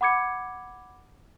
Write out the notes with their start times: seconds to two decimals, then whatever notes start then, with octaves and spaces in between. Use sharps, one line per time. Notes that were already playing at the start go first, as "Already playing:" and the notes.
0.01 F#5 B5 D6 G#6 C#7